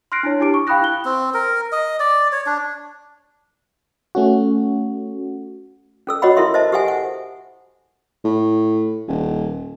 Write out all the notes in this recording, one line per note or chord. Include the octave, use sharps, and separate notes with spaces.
C6 F6 F#6 A#6 C7 D7
D4 E4 C#5
D4 E4 G4 D6 D7
C#6
F5 G5 B5 D#6 F#6 A#6
E4 F#6 G7
C4
A#4
D#5
D5
C#5
D4
A3 C#4 F#4
C#4 A4 E6
F#4 C#5 D#5 F#5 B5
E4 A4 A#4 E5 C6
C5 D#5 E5 A5
G4 A4 C5 E5 F#5 G#5
F#5
A2
D#1